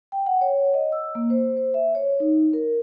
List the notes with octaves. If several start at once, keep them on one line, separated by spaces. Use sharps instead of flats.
G5
F#5
C#5
D#5
E6
A#3
C5
C5
E5
C#5
D#4
A#4